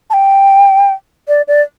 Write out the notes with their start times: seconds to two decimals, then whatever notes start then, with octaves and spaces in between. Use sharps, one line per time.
0.10 A5
0.14 G5
1.28 D5
1.48 D5